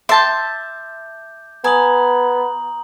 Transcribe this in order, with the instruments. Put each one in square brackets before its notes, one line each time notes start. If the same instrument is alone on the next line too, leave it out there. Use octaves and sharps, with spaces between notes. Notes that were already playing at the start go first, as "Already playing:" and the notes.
[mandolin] E5 A5 [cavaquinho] C6 [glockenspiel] D6 G6
[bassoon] B3 [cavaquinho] G#5 [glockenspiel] A#5 D#6 F#7